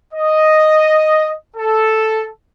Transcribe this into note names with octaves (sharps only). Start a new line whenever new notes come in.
D#5
A4